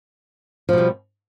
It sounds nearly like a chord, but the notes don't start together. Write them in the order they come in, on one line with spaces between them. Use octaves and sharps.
F3 B2 G3